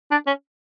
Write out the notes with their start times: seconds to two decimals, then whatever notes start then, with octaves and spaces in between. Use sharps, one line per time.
0.11 D4
0.27 C#4